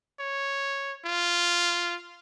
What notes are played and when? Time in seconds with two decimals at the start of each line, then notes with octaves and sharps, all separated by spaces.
0.20 C#5
1.05 F4